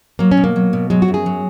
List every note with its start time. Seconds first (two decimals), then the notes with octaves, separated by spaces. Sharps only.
0.19 F#3 A#3
0.31 C#4
0.37 B2
0.44 A#3
0.56 F#3
0.73 B2
0.90 F#3 G#3
1.02 F#4
1.08 F#2
1.14 G#4
1.26 F#3